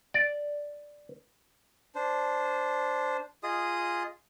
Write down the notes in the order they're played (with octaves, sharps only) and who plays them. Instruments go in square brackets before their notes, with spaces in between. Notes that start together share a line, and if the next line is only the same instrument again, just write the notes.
[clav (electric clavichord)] D5
[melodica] D4 C5
F4 G#4 D#5 D#6